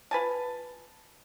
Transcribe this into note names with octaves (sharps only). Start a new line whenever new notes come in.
F4 B4 G#5 A5